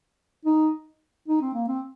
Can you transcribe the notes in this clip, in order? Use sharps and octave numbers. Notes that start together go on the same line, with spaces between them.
D#4
D#4
C4
A#3
C4